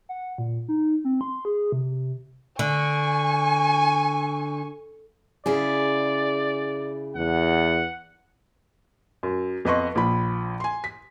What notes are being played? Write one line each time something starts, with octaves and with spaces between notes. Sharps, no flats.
F#5
A#2
D#4
C4
C6
G#4
C3
D3 G#5 C#6
C#3 E4 G#4 D5
E2 F#5
F#2
F2 B3 B4 D#5 C6 C#6
A#1 F3 B5
G#5 C6
B6